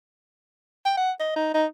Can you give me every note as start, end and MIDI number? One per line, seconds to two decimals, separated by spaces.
0.85 0.94 79
0.98 1.11 78
1.20 1.35 75
1.36 1.51 63
1.54 1.66 63